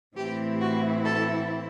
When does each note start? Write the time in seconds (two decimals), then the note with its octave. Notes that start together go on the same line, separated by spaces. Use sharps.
0.16 A2 E3 A3 C4 E4 G4
0.60 F#4
1.05 A4